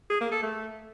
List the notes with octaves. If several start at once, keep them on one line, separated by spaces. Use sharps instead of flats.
G#4
A#3
A4
A3